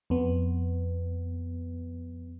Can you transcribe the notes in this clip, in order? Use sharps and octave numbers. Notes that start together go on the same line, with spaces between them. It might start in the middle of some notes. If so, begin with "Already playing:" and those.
F2 B3